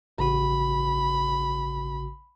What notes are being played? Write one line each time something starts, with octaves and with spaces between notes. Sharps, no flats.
A1 C#3 F#4 B5